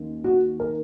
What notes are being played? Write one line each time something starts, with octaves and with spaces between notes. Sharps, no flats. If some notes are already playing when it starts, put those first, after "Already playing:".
Already playing: D#2 D#3 A#3 C#4
F#4
A#4